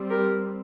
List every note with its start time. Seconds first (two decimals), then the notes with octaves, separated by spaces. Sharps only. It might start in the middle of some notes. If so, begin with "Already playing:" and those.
Already playing: G3 C4
0.09 G4 A#4